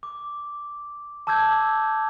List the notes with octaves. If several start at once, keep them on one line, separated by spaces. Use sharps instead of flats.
D6
A5 D6 E6 G6 G#6